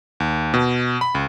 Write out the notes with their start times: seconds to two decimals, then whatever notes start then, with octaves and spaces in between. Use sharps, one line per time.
0.20 D#2
0.54 B2
1.01 B5
1.15 C#2